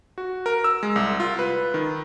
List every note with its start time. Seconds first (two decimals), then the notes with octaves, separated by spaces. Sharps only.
0.18 F#4
0.46 A#4
0.64 E6
0.83 G#3
0.96 C2
1.20 F4
1.39 B4
1.74 D#3